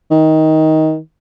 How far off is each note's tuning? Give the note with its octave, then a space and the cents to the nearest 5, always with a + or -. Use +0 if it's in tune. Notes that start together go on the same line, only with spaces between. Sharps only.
D#3 +15